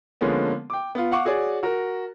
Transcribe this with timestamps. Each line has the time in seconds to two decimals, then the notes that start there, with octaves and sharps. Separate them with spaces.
0.21 D3 F3 G#3 A#3 B3 C#4
0.70 G5 D6
0.95 B3 F4
1.11 F5 F#5 C#6 D6
1.25 F#4 G#4 C#5 D5
1.63 F#4 A#4